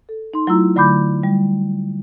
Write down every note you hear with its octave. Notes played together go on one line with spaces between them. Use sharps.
A4
D#4 C6
F#3 A3 E4 F4 A#5 E6
D3 F#3 A3 B5 D6 G6
G3